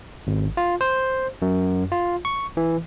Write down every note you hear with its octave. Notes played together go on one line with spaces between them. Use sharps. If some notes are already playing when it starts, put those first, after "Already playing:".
G#1
F4
C5
F#2
F4
C#6
E3